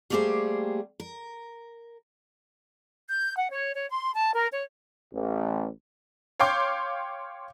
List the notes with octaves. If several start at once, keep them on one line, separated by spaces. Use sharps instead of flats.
G3 A3 A#3 G4 G#4 C5
A#4
G6
F#5
C#5
C#5
C6
A5
A#4
C#5
A1
C#5 F5 G5 C6 D6 G6